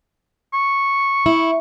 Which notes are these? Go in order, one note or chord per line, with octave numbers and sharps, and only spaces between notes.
C#6
E4